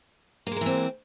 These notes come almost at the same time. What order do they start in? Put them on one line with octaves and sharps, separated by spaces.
A#3 G#3 A#4 E3 C4